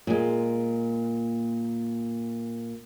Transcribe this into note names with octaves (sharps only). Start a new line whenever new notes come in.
A#2 G#3